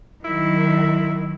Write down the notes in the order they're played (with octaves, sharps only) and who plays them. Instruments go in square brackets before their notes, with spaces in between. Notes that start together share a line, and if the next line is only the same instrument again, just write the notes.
[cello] D#3 F#3 [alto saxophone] E4